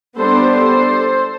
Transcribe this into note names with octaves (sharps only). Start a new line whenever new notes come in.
G3 B3 D4 A4 C5
A4 C5